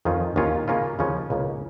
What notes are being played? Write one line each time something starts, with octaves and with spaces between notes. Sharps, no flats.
F2 D#3 C#4 F4
D#2 D#3 C#4 F4
C#3 A#3 C#4 F4
D#2 C#3 F3 C#4
C#2 C#3 A#3 C#4